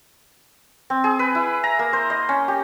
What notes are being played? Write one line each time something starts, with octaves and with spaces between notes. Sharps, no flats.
C4
G#4
B4
E4
A#5
A#3
C5
D#5
C#4
G4